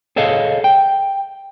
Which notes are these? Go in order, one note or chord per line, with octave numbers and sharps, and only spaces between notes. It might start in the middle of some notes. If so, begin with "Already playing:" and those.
G#4 A4 C#5 D#5 F5
G5